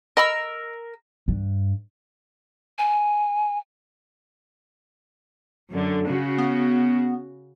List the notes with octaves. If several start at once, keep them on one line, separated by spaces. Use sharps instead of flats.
A#4 D#5 B5 E6
G2
G#5
F#2 D3
C#3 F#4
B3